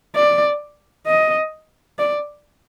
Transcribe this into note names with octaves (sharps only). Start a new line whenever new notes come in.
D5
D#5
D5